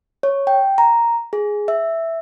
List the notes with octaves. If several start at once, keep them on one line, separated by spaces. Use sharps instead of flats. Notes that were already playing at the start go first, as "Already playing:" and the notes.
C#5
G5
A#5
G#4
E5